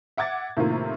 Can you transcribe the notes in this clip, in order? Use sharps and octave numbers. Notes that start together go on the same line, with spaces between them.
E5 F#5 D6 G#6 A6
A2 C3 D#3 A#3 F4